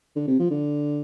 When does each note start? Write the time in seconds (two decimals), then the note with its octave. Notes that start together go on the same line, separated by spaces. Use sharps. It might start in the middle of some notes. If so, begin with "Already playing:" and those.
0.16 D3
0.28 C3
0.39 F3
0.51 D3